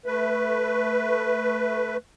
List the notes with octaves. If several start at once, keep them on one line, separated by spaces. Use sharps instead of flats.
A3 B4